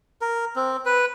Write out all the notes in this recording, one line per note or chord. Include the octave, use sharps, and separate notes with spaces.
A#4
C4
B4